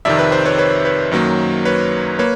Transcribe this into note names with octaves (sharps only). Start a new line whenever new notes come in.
F2 C3 D#3 D5 E5
B4
C5
B4 C#5
B4 C#5
B4 C#5
F#2 D#3 F#3 A#3
B4 C#5
A#3 B4 C#5